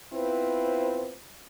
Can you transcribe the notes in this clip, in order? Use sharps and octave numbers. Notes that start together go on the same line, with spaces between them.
B3 C4 E4 F4 B4 C5